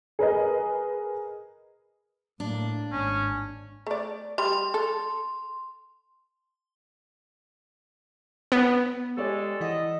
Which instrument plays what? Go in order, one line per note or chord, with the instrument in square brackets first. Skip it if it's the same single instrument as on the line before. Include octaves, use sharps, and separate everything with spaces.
[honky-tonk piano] G#4 A#4 B4 D#5
[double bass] A2 A#3 [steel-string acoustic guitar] D4
[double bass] G#1 [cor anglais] C#4
[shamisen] A3 D5
[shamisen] G3 [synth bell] C6
[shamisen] A4
[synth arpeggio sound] B3
[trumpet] G#3 [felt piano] G4 C#5 D5 [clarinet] A4
[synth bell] E3 E4 F#5 [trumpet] D#5